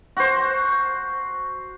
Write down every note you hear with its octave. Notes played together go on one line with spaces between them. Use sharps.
F#4 C5